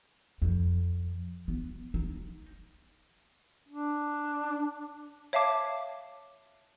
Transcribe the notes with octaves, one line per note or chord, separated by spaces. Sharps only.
F2
B3
D#4
D4
C#5 E5 F5 A5 D6